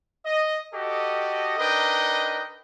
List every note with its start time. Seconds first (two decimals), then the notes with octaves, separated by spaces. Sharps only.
0.25 D#5
0.73 F#4 G4 A4 D#5
1.58 D4 D#4 A#4 B4 D#5 G5